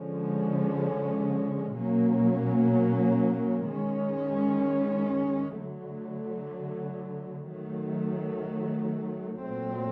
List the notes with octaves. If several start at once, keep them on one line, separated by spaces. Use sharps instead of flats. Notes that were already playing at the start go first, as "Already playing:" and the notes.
Already playing: D3 F3 G#3 C#4
B2 F#3 A#3 C#4
D#3 G#3 C#4
D3 F#3 A3
D#3 F#3 A3
A#2 F#3 A3 C4